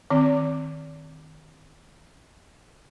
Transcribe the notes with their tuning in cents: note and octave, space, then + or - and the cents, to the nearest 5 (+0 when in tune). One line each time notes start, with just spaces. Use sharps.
D#3 +0 C4 +0 D5 -40